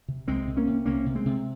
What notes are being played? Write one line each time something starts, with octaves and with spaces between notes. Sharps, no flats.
C3
C2 G#3 C4
C3
A#3 C#4
C3
C2 A#3 C#4
C3
G#3 C4
C3